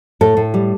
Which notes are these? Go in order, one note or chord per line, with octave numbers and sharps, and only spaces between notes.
A2 A4
A2
G3